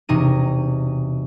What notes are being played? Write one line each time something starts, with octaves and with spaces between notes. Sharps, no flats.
E1 C3 D#4 D#7